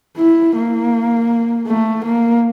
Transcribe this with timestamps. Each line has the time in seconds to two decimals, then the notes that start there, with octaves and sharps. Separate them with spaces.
0.17 E4
0.55 A#3
1.67 A3
2.05 A#3